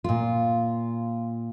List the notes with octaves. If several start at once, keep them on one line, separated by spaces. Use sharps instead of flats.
A#2 F4